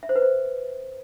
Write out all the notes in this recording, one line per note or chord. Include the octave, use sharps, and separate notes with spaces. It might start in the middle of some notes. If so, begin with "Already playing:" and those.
E5
C5
B4
C5